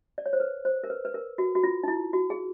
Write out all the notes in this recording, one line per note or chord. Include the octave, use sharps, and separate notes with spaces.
D5
C#5
C5
B4
C5
A#4
B4
B4
A#4
F#4
F#4
F4
D#4
E4
F#4
G#4